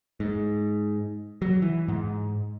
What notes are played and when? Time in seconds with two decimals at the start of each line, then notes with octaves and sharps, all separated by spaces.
0.20 G#2
1.42 F#3
1.62 E3
1.88 G#2